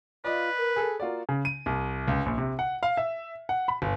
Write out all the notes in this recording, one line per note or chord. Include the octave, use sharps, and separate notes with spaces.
F4 B4 D5 D#5
A#4
G#4 A4
A#3 F4 F#4 D5
C#3
D#7
C2
C#2
A#1
C3
F#5
F5
E5
F#5
B5
G1